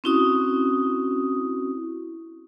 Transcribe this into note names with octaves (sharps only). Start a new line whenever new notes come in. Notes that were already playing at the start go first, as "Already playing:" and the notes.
C4 C#4 E4 F#4 D#6